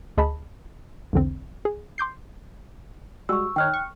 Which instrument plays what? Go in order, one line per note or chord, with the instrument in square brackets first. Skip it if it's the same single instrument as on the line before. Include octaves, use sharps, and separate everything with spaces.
[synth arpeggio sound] D2 G#4 D#5 A5 B5
B1 E2 D3 C4
G#4
C6 D6 G6 C7
[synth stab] G3 G#3 F#4 [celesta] C#6 E6
[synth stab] D#3 D#4 C#5 [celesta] G5 F6 F#6
[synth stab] C#6